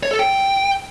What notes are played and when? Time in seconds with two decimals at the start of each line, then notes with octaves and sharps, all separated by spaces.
0.03 C#5
0.11 A4
0.19 G5